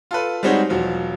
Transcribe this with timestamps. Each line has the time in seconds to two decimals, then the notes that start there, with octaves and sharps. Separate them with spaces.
0.11 F4 A4 B4
0.43 G3 G#3 C4 D#4 F#4 C#5
0.69 E1 F3 F#3